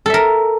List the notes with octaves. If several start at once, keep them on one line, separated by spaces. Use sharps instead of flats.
A4 A#4 E5